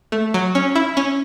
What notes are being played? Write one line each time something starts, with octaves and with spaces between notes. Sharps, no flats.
A3
F#3
C#4
E4
C#4